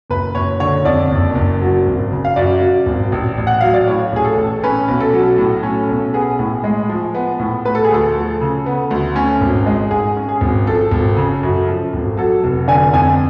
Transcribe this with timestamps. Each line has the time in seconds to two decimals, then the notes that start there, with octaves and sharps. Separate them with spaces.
0.10 F#1 B4
0.35 F#1 C#5
0.60 D3 C#5
0.85 F2 D5
1.11 F#1
1.35 F#1
1.62 F#3
1.86 G#1
2.11 C#3
2.25 F5
2.36 F#2 D5
2.61 F#3
2.86 G#1
3.12 A1
3.38 A1
3.47 F#5
3.61 F#3 F5
3.74 D5
3.87 A2 C#5
4.12 A1 G#4
4.25 A4
4.37 A1
4.64 C#4 B4
4.88 B1
5.00 A4
5.13 F#3
5.38 A2
5.63 C#4
5.89 B1
6.14 B3 G#4
6.39 A2
6.64 G#3
6.89 F3
7.14 B3
7.39 A2
7.65 B3 B4
7.75 A4
7.85 G#4
7.90 D2 A4
8.15 F3
8.41 C#3
8.66 B3
8.91 D2
9.16 C#4
9.41 G#1
9.66 G#3
9.91 G#2 G#4
10.16 C#4
10.29 G#4
10.41 G#1
10.67 F3 A4
10.91 G#1
11.17 C#3
11.43 F#2
11.68 F3
11.93 G#1
12.17 F#3 A4
12.44 F1
12.68 D3 G#5
12.93 F2 G#5